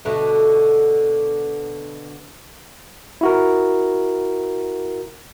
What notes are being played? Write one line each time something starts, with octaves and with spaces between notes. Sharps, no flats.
B2 D3 A3
E4 F#4 A#4